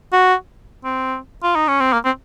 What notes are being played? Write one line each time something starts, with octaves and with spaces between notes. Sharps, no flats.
F#4
C4
F4
D#4
C#4
C4
A#3
C4